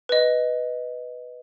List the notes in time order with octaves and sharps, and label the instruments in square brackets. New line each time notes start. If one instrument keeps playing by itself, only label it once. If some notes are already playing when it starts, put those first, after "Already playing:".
[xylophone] B4 D#5